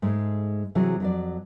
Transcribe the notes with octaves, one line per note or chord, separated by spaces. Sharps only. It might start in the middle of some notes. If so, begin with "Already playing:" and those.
G#2 G#3 A3
C3 E3 F#3 G#4
F2 F#3 D5